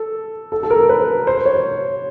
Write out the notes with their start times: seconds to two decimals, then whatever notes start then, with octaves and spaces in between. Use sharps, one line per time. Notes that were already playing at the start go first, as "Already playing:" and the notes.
Already playing: A4
0.52 A4
0.63 A4
0.70 A#4
0.89 B4
1.27 C5
1.46 C#5